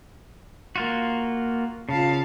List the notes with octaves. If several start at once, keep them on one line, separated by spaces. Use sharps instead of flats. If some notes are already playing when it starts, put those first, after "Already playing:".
A#3 F4 F#4
C#3 F4 F5 A5